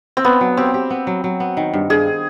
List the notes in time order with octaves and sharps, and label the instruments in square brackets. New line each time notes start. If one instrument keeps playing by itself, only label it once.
[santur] C4
[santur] B3 [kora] D4
[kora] F#3
[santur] C4 [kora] G4
[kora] G4
B3
F#3
F#3
B3
D#3
G2
[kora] G2 [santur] G#4